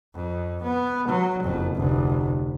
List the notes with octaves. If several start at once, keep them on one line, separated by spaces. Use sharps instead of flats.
F2
B3
F#3
F#1 F2
F1 D2